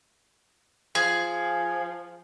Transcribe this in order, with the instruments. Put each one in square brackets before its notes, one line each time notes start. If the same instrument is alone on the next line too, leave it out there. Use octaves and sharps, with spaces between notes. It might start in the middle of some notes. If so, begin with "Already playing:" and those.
[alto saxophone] F3 [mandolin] G#4